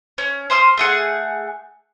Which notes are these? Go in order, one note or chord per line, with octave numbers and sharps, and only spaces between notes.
C#4
C5 C6 D#6 F6
A3 G#4 F#5